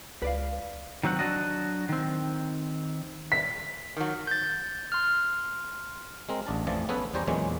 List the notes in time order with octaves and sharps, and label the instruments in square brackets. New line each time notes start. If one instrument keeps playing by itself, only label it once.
[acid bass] C#2 [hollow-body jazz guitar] B4 D5 F5
[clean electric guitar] D#3 F#3 C4 F#5
F#3 D4 F#4 D#5
D#3 C4
[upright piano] B6
[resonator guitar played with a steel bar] D#3 F#3
[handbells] G6 A6
C6 F6
[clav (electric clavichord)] G#3 C4 A#4
A1 D4 A5
A1 F2 E3 F3 D5 A5
B3 C#4 G#4 A4 B4
E2 G3 C5 C#5 G#5 A#5
E2 A#2 E3 F#3 G#3 C#4